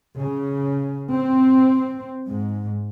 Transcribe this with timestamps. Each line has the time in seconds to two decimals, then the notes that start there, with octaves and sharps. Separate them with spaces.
0.16 C#3
1.14 C4
2.29 G#2